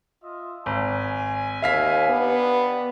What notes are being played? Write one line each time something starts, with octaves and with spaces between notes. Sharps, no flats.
F4 D#5 E5
G#1 G#5
D#2 E5 F5 B6
B3 D4 G4